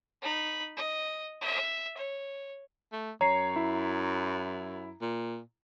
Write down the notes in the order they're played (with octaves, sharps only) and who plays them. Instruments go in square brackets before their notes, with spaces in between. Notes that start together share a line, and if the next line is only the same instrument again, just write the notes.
[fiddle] D#4 B5
D#5
E5
C#5
[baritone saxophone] A3
[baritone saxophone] F#2 [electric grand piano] C#5 [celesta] A#5 C7
[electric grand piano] E4
[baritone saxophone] A#2